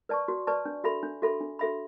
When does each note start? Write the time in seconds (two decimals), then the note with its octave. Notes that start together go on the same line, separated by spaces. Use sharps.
0.09 B4 D5 A5 C#6
0.28 F#4
0.47 B4 D5 A5 C#6
0.65 D4
0.84 F#4 A4 E5 B5
1.03 D4
1.22 F#4 A4 E5 B5
1.40 D4
1.59 F#4 A4 E5 B5